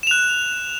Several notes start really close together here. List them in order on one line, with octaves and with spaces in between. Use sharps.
E7 F7 F#6